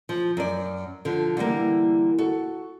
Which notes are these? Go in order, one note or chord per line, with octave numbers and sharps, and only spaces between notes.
F3
F#2 D5
D3 F3
D3 E3 G3 A#3
F#4 A4